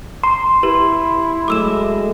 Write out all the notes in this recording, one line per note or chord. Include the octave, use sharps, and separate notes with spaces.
A#5 C6
E4 G4 B4 E7
F#3 G#3 A3 D6 E6 E7